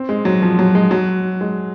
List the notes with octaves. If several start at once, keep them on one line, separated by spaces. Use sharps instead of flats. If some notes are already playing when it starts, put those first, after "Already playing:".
Already playing: C4
G#3
F#3
F3
F#3
G#3
F#3
G#3